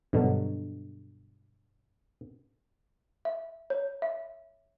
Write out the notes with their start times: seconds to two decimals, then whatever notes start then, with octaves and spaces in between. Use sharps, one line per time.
0.13 G2 B2 D3 F#3
3.25 E5
3.70 C#5
4.02 E5